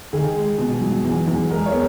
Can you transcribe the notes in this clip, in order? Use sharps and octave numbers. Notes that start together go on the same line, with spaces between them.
D#3 G#4
G#3
B2
F#3
E2
E2
G#3 A#4
C#5
B3